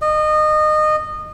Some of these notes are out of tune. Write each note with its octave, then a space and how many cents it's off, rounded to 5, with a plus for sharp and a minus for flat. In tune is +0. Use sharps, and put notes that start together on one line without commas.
D#5 -25